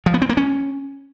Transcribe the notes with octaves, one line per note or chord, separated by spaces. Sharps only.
F3
B3
C4
A#3
C#4